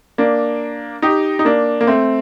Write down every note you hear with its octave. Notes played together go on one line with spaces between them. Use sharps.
A#3 D4
D#4 G4
D#4
A#3 D4
A#3
A3 C4